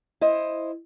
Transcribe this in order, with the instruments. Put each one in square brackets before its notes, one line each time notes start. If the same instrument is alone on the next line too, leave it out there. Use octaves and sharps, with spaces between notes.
[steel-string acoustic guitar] E4 C5 D#5